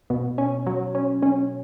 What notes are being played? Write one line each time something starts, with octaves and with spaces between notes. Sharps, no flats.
B2
C#4
F#3
C#4
C#4